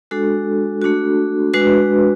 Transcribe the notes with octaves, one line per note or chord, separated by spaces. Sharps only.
G#3 D4 F#4 A4
A3 D4 F#4
G#3 D4 F#4 B4